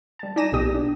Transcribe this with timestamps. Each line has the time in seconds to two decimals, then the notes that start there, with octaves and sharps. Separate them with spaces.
0.19 G3 A5
0.36 D#4 D5 G#5 A#6 D#7 E7
0.52 B1 A#2 B3 G4 D#6
0.74 D4